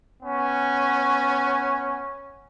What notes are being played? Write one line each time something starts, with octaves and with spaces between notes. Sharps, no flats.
B3 C#4